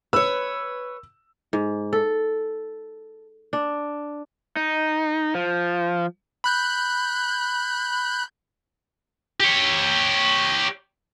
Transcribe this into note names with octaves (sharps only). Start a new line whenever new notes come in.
B4 C#5 E6
G#2
A4
D4
D#4
F3
B5 F#6 G6
G4 C#5